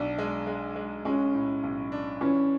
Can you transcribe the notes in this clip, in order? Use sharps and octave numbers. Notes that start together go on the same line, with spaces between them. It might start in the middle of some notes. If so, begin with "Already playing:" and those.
Already playing: B1 D4
G#3
G#3
G#3
G#3 C#4
A2
B1
D4
E3 C#4